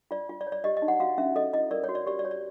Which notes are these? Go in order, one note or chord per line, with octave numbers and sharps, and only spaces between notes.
F4 D5
F4
D5
C#5
D5
G4 D#5
D#5
D#4
F#5
F#4 F5
C#4 E5
A4 D#5
E4 D#5
A#4 D5
C#5
F#4
D5
G4 D5
D5
C#5
D5